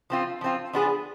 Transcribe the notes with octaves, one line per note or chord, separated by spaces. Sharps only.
F3 C4 F4
F3 C4 F4
F3 B3 D4 G#4